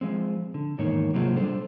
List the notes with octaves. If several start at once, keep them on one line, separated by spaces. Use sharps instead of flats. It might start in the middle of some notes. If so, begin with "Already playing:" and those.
F3 G#3 C4
D3
E2 G#2 D#3 A#3 C#5
C3 F#3 A#3 C4 F4 G#4
G3 D4 A4 C5